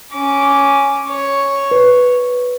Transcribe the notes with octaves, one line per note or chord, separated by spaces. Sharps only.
C#4 D6
C#5
B4